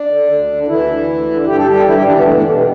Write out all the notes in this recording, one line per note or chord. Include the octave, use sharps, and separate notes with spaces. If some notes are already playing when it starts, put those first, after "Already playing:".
Already playing: D4
D3
D2
D3
D2 E3 E4
D3
D2
D3
G2 G4
A4
D3 G3 G4
G2 E3 E4
G3 G4
D3 E3 D4
B2 B3
E2 A3
D3 D4
B2 A3
G3